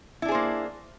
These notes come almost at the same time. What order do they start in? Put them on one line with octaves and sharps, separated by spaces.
E4 D4 G#4 C5 A#3